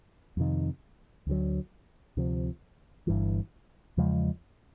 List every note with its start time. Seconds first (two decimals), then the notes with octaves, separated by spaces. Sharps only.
0.37 F2 C3 D#3
1.27 D2 D3 F#3
2.17 D2 C3 F3
3.07 G1 G2 E3
3.97 E2 C#3 F3 G#3